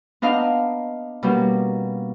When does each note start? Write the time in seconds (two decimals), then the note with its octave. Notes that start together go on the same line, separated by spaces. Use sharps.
0.22 B3 D4 D#4 F5
1.23 B2 G3 A#3 C#4